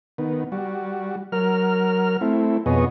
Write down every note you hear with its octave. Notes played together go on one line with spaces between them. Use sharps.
D#3 B3
G3 F#4
F#3 A#4 F6
A3 C4 E4
F2 B2 B3 G#4 C#5 D#5